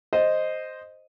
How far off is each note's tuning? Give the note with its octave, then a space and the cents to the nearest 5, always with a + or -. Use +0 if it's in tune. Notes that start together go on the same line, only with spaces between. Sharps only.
C5 +0 D#5 +0